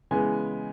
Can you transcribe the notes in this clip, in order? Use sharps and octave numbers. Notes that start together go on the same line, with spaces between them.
C#3 E3 G#3 B3 G#5